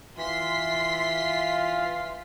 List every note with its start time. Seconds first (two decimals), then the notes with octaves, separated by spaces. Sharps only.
0.17 E3 F4 E5 C6 B6 C7